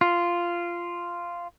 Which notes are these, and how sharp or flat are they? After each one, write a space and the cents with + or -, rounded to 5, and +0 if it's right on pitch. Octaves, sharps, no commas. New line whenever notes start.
F4 -10